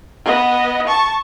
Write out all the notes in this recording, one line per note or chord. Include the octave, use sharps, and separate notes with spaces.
B3 D#5
A5 C#6